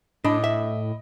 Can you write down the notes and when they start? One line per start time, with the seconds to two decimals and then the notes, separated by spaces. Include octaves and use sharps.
0.24 A2 D4 D#5 B5 D6
0.44 E5